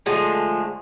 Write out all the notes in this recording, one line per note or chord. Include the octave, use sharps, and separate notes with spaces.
D3 F3 G#3 A3